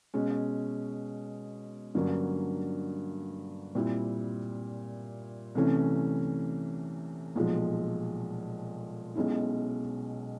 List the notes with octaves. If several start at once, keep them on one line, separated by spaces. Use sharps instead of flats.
B2 G#3 C#4
G2 D3 F#3 A#3 C#4
A#2 G3 C4 E4
C2 C3 E3 A3 C#4
B1 A#2 F3 G#3
B1 B2 G#3 C#4 E4